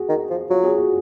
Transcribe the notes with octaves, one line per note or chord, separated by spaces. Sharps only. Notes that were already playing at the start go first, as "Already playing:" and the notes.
Already playing: F#4 G#4
D#3
F3
F#3 F4
G#4
F#4